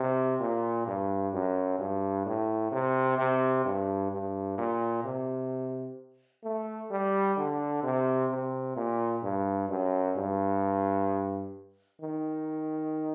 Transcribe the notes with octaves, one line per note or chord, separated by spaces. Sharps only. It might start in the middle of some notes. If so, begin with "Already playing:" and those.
Already playing: C3
A#2
G2
F#2
G2
A2
C3
C3
G2
G2
A#2
C3
A3
G3
D3
C3
C3
A#2
G2
F#2
G2
D#3